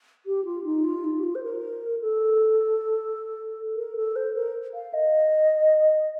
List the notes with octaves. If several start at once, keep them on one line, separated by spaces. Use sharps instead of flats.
G4
F4
D#4
F4
D#4
G4
F4
C5
A#4
A4
A#4
A4
C5
A#4
F5
D#5